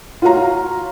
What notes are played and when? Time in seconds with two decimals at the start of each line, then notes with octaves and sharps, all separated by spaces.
0.22 F4 F#4 C#5 F5 A#5